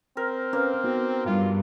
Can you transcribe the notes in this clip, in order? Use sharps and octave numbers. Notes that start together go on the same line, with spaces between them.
C4 A#4
A#3 C#4 B4 C5
B3 D#4 F#4
G2 F4